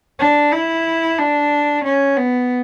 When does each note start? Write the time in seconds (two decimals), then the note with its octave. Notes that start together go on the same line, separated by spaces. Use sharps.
0.19 D4
0.53 E4
1.18 D4
1.85 C#4
2.17 B3